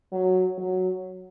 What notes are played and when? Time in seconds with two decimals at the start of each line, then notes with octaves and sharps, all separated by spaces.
0.13 F#3
0.58 F#3